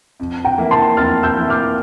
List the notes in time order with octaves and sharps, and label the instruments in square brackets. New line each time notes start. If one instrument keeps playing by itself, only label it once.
[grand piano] F2
[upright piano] G5 A#5
[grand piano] E3 A#3 E4
[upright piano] A5 C6
[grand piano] F2 [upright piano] F6 A6
[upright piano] E6 G6
[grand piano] E3 A#3 E4
[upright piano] D6 F6